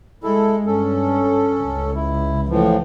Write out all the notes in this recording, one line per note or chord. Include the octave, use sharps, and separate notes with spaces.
G#3 E4 A4
G2 C#4 A4
C#2
E4
A2 E3 F3